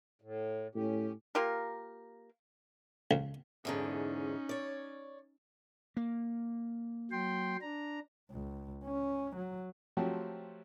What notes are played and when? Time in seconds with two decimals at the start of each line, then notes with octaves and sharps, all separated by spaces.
0.22 A2
0.75 A2 C#4 G4
1.35 A#3 F4 G4 A#4
3.11 C#2
3.65 E2 G#2 D3 C#4 D#4
4.49 C#5 D5
5.97 A#3
7.11 F#3 G5 C6
7.62 D4 A#5
8.31 C#2
8.84 C#4
9.36 F#3
9.97 F3 F#3 A3 C4 F#4 G4